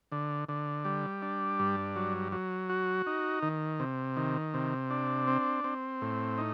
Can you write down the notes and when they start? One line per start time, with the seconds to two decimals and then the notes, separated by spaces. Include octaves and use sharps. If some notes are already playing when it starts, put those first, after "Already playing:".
0.12 D3
0.49 D3
0.85 G3
1.22 D4
1.59 G2
1.96 F#3
2.32 F#3
2.69 F#4
3.07 D#4
3.43 D#3
3.80 C3
4.17 D#3
4.54 C3
4.90 D4
5.27 C4
5.64 C4
6.02 A2
6.38 D#4